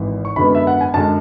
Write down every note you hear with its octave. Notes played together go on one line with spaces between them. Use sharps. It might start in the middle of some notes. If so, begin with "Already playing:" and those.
Already playing: G#1 G#2 E3
C#6
F#2 D3 G#3 B3 B5
E5
F#5
G#5
F#2 D3 G#3 A5